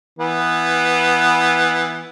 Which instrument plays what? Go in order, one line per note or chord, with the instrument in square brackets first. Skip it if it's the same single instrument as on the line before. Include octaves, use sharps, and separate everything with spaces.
[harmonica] E3 B3